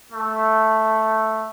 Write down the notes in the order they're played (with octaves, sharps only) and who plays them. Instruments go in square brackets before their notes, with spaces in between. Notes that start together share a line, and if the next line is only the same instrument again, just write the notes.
[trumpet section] A3